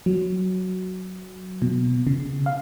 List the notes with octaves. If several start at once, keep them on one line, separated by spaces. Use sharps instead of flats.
F#3
B2
C#3
F5